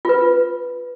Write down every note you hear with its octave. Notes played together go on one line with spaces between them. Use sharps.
F4 B4